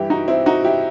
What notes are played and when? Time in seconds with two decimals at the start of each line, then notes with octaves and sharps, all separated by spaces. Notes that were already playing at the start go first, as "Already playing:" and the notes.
Already playing: G2 E3 E4 G4
0.10 D#4 F#4
0.28 C4 E4
0.46 D#4 F#4
0.64 E4 G4